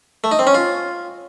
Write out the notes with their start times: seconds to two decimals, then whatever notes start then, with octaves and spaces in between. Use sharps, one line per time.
0.24 A3
0.32 D#4
0.39 C4
0.47 C#4
0.54 F4